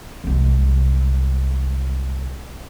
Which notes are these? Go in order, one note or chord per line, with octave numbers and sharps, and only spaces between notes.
C2 G#3